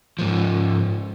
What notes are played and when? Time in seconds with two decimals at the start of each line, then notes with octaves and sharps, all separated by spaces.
0.19 G#2 F3